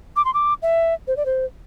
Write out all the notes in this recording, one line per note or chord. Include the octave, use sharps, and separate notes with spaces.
D6
C6
D6
E5
C5
D5
C5